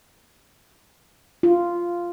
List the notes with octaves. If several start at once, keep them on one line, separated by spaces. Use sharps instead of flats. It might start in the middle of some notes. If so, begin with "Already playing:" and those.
F4